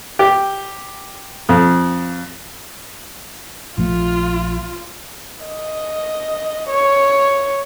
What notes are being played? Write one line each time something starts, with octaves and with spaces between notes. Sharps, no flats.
G4
F2
A#1 F3 A3 F4
D#5
C#5